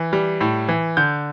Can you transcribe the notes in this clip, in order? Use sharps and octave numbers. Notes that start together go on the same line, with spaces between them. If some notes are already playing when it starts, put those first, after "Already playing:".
Already playing: E3
G3
A2
E3
D3 G6